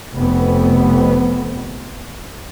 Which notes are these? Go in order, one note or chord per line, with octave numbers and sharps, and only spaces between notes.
F1 F2 B3